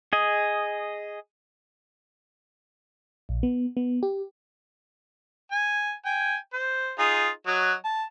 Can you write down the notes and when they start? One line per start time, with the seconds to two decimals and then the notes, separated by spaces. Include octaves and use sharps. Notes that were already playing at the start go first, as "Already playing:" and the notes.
0.13 G#4 D#5
3.29 A#1
3.43 B3
3.77 B3
4.03 G4
5.51 G#5
6.05 G5 G#5
6.53 C5
6.99 D#4 F4 G#4
7.47 F#3 F#4 D#5
7.85 A5